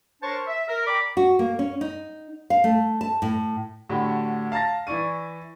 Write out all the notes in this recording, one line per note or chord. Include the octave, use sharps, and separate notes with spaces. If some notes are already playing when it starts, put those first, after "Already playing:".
D4 A#4 C5 C#5 A5 C#6
E5
A#4
D5 G5 A#5 B5 D6
F#4
A#3
C#4
D#4
F5
A3
A5
A2
A2 D3 F#4 G4 B5
F5 A5 A#5 A6 A#6
E3 E4 D5 C#6 D#7